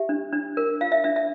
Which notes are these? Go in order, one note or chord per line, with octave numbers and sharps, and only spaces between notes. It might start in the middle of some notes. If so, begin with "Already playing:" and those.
Already playing: G4 E5
D4
D4
A#4
F4 F5
E5
D4 E5
E5